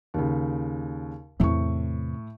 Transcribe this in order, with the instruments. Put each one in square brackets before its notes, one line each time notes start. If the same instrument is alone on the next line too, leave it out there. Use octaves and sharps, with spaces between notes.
[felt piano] D#2 C#3
[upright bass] E2 C3 [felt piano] A2 C#6